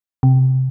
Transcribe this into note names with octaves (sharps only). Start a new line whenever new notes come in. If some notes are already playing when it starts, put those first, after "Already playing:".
C3